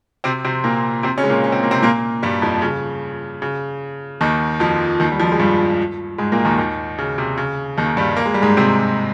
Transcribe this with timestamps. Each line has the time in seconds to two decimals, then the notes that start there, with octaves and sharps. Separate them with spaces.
0.24 C3 C4
0.45 C3 C4
0.64 A#2 A#3
1.03 C3 C4
1.18 C#3 C#4
1.24 G#3
1.30 A#2 A#3
1.44 C#4
1.52 C4
1.63 A#3
1.71 C3 C4
1.82 A#2 A#3
2.23 G2 G3
2.42 F2 F3
2.62 C#3
3.42 C#3
4.21 D#2 D#3
4.60 F2 F3
5.00 D#2 D#3
5.12 G3
5.20 F2 F3
5.32 G#3
5.40 G2 G3
6.18 G#2 G#3
6.32 A#2 A#3
6.45 D#2 D#3
6.58 D#2 D#3
6.98 C#3
7.18 C3
7.38 C#3
7.77 D#2 D#3
7.97 G2 G3
8.17 A#3
8.26 G#3
8.34 G3
8.42 G#2 G#3
8.57 C3 C4